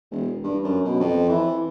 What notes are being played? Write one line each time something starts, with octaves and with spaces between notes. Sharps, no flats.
E1
G2
F#2
B2
F2
E3